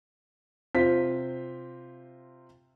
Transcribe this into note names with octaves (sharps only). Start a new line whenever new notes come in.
C3 F4 C5 B6